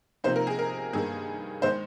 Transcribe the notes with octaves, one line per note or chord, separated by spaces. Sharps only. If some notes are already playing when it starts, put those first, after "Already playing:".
C3 F3 A#3 D#4 C5
A#4
G#4
A#4
G2 D#3 A#3 G#4
D#3 G#3 C5